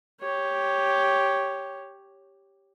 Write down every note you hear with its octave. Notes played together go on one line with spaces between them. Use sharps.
G4 C#5